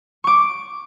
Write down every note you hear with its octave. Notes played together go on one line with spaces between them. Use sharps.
C#6 D6